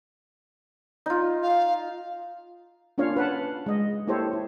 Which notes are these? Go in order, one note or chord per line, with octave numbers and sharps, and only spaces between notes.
D#4 F4
F5
A#3 C#4 D4 F4 C#5 F5
B4 F#5 A5
G#3 D#5
A#3 E4 G4 A4 C5 C#5
E4